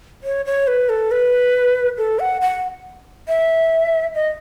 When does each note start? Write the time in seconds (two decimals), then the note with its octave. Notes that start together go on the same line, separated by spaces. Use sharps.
0.23 C#5
0.46 C#5
0.67 B4
0.89 A4
1.11 B4
1.98 A4
2.20 F#5
2.41 F#5
3.28 E5
4.15 D#5